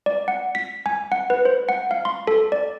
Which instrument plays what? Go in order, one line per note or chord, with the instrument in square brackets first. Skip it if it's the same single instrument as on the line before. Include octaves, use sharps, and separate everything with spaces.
[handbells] D5
F#5
B6
G#5
F#5
B4
C5
F#5
F5
C6
A4
D5